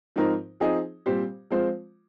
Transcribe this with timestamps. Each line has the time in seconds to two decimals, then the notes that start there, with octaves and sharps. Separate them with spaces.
0.16 G#2 F3 C4 D#4 A#4
0.60 F3 C4 D#4 G#4 D#5
1.06 A#2 G3 C4 G4 C5
1.50 F3 G#3 C4 F4 C5